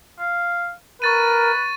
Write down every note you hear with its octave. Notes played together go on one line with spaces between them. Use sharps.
F5
A#4 B4 C#6 A6 D#7